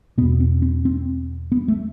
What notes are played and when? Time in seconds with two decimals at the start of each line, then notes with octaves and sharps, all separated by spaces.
0.18 B2 B3
0.21 E2
0.40 C4
0.62 C4
0.85 C4
1.52 B3
1.68 A3